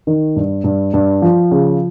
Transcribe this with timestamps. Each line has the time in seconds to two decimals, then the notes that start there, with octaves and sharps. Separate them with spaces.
0.07 D#3
0.36 G2
0.64 G2
0.94 G2
1.22 F3
1.51 C#3